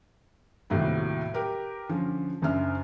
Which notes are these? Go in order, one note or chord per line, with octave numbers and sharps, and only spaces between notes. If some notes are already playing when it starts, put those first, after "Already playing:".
D#2 A2 C3 F#3 G3
G4 A#4 B4
D3 F3 C#4
F#1 F#2 D4 E5 F6